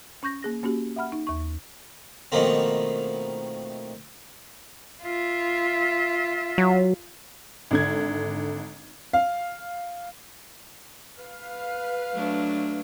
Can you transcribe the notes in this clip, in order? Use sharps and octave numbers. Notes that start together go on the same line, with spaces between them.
C#4 C#6 G6 A#6
A#3 G#4 A#6
A#3 C#4 F#4 G4
E5 F#5 B5 F6
D#4
D#2 C#6
B2 D#3 F3 A3 A#3 C4
F4 E5
F#3
G#1 D3 G#6
F5
B4 F5
F#3 A3 D4